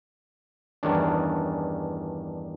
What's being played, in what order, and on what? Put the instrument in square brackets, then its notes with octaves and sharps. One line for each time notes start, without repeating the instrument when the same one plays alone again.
[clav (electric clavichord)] E2 G2 D#3 C#4 D4